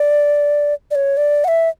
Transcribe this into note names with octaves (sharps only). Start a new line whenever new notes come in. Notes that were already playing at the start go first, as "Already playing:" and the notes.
Already playing: D5
D5
C#5
D5
F#5
E5